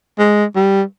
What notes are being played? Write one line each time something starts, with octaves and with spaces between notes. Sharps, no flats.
G#3
G3